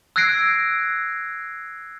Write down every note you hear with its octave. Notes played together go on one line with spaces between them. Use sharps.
E6 F#6 G#6 A#6 C7 D7